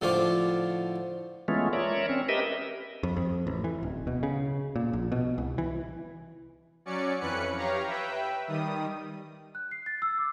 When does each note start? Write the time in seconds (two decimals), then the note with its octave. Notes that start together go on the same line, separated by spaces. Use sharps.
0.01 A2 D3 F3 F4 D6
1.48 E3 G#3 A3 B3 C#4 F4
1.73 A#4 C#5 D5 E5
2.09 C4 C#4
2.29 G4 A#4 B4 D#5 E5
3.03 F2
3.16 F2
3.47 A1
3.64 E3
3.83 D1
4.07 B2
4.23 C#3
4.76 A#2
4.93 A#1
5.12 B2
5.38 C2
5.58 E3
6.85 F#3 C#4 D5 C#7
7.20 F2 E3 C#4 B4 F#6 C#7
7.57 G4 C#5 F5 A#5
7.87 B4 E5 G5
8.48 D#3 G3 D#6
9.55 F#6
9.71 C7
9.86 A6
10.02 E6
10.18 D6